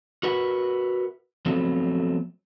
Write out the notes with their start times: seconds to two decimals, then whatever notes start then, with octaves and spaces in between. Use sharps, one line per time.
0.23 F#4 A#4 B4 E5 F#5
1.46 F3 F#3 A3 B3 C4